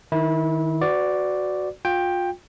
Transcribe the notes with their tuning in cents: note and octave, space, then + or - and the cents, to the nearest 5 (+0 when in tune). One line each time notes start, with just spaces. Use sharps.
D#3 +0 E4 -25
F#4 +0 B4 +40 D5 +0
F4 +30 G5 +10